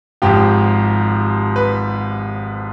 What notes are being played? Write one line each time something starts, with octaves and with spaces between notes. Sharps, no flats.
G#1 G#2 F3 G4
B4